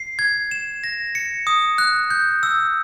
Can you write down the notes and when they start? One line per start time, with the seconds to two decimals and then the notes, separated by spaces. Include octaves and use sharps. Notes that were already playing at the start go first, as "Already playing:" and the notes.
Already playing: C7
0.19 G#6
0.51 E7
0.84 A#6
1.15 C#7
1.47 D#6
1.78 F#6
2.10 G6
2.43 E6